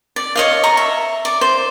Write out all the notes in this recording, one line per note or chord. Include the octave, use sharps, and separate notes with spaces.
D5
C#5 D#5 F5
A#5 C#6
E5
D5
C5